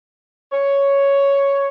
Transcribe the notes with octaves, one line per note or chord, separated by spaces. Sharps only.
C#5